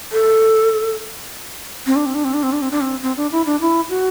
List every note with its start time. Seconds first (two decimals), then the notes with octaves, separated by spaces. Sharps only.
0.12 A4
1.87 C4
1.96 D4
2.06 C4
2.15 D4
2.24 C4
2.34 D4
2.43 C4
2.53 D4
2.62 C4
2.71 D4
2.81 C4
3.03 C4
3.17 D4
3.32 E4
3.46 D4
3.61 E4
3.89 F#4